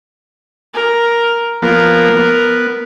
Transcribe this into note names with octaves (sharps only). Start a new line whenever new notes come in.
A#4
F3 A#3 B3 A#4
B3